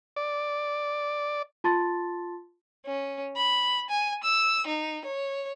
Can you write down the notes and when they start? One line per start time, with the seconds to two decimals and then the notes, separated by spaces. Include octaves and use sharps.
0.16 D5
1.64 F4 A5 C6 A6
2.86 C#4
3.37 B5
3.90 G#5
4.24 E6
4.67 D#4
5.05 C#5